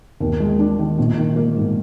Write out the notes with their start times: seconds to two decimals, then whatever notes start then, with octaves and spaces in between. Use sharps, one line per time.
0.20 D#2
0.40 G#3
0.59 D4
0.79 D#3
0.98 A#1
1.17 D#3
1.36 A#3
1.56 G#2